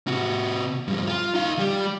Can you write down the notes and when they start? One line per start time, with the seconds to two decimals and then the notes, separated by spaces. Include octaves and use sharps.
0.07 C3 F#4
0.88 G2 F3
1.07 F4
1.34 D#4 F5
1.59 G3 G4